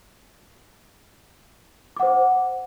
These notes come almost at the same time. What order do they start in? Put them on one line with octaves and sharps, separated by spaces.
D6 F#5 C5